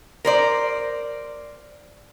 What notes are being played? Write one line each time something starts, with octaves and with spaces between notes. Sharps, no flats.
A#4 C5 D5